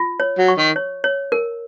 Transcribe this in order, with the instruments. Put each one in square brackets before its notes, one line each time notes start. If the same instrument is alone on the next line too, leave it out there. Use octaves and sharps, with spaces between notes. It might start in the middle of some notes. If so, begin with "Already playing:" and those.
Already playing: [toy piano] F4
C#5
[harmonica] F#3
[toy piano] C#6
[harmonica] D#3
[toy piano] C#5
C#5
A#4